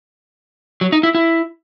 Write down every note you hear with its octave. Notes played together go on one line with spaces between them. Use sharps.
F#3
D#4
E4
E4